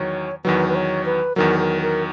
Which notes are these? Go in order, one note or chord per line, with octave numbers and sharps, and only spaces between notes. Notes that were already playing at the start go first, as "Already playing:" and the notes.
Already playing: E2 D#3 F#3 C#5
E2 D#3 F#3 B4
B4
C#5
B4
E2 D#3 F#3 A#4
A#4
A#4